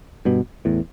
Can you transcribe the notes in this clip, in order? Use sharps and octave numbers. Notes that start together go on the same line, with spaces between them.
G2 B2
E2 A2